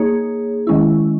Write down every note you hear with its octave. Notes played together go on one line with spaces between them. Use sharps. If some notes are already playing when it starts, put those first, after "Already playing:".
Already playing: A#3 D#4 G#4 C#5
D#3 G#3 C#4 E4